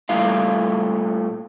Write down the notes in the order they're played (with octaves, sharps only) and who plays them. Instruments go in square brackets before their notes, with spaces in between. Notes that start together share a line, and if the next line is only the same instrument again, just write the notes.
[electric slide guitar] A#2 G3 A3 E4 F5